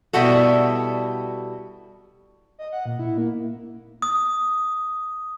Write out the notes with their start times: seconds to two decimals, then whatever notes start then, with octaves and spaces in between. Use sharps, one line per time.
0.13 B2 G3 E4 F#4 A4
2.59 D#5
2.72 F#5
2.86 A#2
2.99 E4
3.18 A#3
4.02 D#6